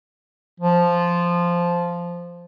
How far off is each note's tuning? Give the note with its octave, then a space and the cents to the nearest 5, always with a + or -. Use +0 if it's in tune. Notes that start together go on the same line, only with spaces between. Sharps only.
F3 -5